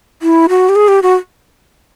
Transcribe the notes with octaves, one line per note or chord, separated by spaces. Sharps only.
E4
F#4
G4
G#4
G4
F#4